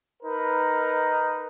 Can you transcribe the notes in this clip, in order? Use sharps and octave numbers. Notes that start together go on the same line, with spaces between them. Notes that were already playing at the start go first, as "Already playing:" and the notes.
D#4 A#4 B4